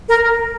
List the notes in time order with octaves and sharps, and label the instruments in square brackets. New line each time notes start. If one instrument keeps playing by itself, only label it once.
[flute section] A#4